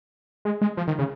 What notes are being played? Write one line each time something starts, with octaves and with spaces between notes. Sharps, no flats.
G#3
G#3
F3
D#3
C#3